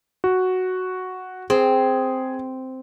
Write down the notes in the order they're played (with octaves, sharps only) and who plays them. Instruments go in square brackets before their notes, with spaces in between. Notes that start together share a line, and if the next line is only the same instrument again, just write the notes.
[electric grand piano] F#4
[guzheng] C4 [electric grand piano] G#4